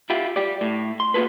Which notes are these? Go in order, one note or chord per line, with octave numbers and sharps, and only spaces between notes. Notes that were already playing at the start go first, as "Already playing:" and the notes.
E4 F4 G4
G4 D5
A2
C6
A#3 B3 F4 G#4 A4 B4